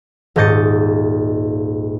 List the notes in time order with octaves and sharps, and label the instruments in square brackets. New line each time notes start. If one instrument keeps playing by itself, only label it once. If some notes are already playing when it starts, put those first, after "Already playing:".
[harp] D#1 G#2 D#5 G6 A6 C#7